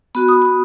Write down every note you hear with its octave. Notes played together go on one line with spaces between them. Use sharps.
B3 F#4 B5
D#6
D#6